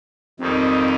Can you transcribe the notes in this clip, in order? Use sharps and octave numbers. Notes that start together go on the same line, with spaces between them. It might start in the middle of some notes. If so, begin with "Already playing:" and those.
F2 D#3 G3 A#3 C4 D#4